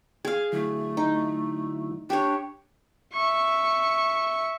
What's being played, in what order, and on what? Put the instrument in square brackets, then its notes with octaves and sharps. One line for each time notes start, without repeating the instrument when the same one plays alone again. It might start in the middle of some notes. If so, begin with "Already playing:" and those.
[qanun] G#4 F5 [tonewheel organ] G#6
[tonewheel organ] D3 F#3 E4 [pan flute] A3
[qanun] D#4
[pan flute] D4 [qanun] G4 C#5
[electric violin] E5 C#6